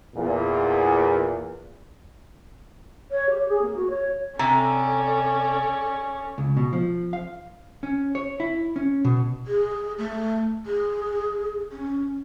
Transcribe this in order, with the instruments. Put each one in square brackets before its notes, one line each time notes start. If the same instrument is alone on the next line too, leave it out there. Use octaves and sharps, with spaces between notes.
[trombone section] E2 A#2
[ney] C#5
G4
G#4
A#3
F#4
C#5
[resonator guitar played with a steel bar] C3 [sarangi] C#4 [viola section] A4 D5 [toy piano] A#5
[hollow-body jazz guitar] C#2
B2
F3
F5
C#4
C#5
E4
C#4
B2
[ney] G#4
A3
G#4
C#4